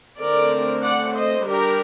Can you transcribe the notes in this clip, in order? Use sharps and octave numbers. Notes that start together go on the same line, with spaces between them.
D3 A3 C4 A#4 D5
D5 F#5
C5 D#5
G3 D4 G4 A#4